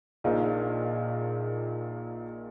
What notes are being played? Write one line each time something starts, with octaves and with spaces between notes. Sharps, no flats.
A#1 A#2 A#3 D#4 G#4